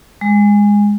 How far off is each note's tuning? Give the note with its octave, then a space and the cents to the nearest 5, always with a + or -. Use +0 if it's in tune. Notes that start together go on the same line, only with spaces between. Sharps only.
G#3 -15